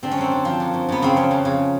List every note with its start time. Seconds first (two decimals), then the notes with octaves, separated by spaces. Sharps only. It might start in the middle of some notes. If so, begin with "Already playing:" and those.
0.03 D3 C4
0.11 C#4
0.17 F#2 C4
0.31 D3
0.45 F3
0.60 F#2
0.74 F#2
0.89 F#2 B3
1.02 C#3 C4
1.16 F3 C#4
1.31 F2
1.45 C#3